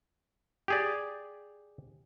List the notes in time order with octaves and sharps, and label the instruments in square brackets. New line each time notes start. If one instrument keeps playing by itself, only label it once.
[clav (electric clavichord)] G4 G#4 D5